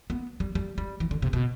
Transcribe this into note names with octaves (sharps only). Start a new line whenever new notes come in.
B3
G3
G3
G3
E3
D3
C3
B2